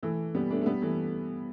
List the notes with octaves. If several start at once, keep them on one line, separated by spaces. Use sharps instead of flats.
E3 A3
G3 B3
A3 D4
A3
G3 B3
E3 A3